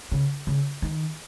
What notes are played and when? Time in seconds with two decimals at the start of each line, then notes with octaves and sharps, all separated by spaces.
0.12 C#3
0.47 C#3
0.82 D#3